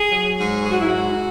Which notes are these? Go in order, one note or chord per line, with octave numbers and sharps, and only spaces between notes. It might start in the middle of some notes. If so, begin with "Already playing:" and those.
Already playing: G#4
F#3
G#2
F#3 G#4
F#4
E4
G#2 F#4